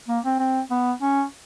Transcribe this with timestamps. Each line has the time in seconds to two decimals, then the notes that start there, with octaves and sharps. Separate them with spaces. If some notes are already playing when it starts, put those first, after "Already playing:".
0.08 A#3
0.24 C4
0.39 C4
0.70 B3
1.01 C#4